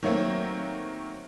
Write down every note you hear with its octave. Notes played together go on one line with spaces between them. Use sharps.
D#3 F#3 A3 A#3 C4